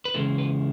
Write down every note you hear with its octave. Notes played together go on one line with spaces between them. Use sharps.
B4
C#3 E3 G#3 C#4 E4 A4
B4